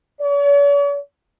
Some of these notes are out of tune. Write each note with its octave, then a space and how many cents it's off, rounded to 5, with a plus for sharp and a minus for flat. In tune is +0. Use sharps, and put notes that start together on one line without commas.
C#5 +45